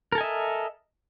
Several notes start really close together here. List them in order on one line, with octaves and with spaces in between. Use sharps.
A#4 A4 G#5 D#5 E5